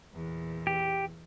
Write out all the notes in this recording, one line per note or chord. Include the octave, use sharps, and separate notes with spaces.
E2 A#2
G4